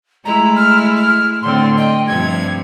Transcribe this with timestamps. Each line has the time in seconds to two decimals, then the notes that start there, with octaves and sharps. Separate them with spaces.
0.25 G#3 A3 E4 A#5
0.56 F6
0.96 F6
1.42 A2 D3 C4 C6
1.77 D#5 G5
2.07 G2 C3 F3 G#6